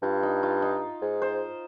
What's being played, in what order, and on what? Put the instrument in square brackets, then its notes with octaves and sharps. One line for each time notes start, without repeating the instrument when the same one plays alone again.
[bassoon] G2 [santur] F4
[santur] D#4
F4
D#4
[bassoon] G#2
[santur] C5